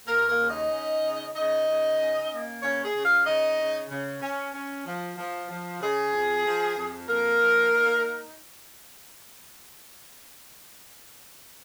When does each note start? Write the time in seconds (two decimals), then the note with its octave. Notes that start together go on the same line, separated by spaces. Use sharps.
0.08 D#2 A#3 A#4
0.29 A#3 A#4
0.40 C#3
0.50 D#4 D#5
0.72 C#4
1.03 C#3
1.35 C#3 D#4 D#5
1.67 C#3
1.99 C#4
2.31 A#3
2.63 C#3 C#4 C#5
2.84 G#4
2.95 C#3
3.05 F4 F5
3.26 C#3 D#4 D#5
3.58 C#3
3.90 C#3
4.22 C#4
4.54 C#4
4.86 F3
5.18 F3
5.49 F3
5.81 C#3 G#4
6.13 F2
6.46 F3
6.77 F2
7.09 F2 A#3 A#4
7.41 F3
7.72 D#4